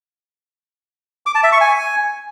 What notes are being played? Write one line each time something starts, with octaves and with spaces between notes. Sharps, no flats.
D6
A5
E5
C#6
G#5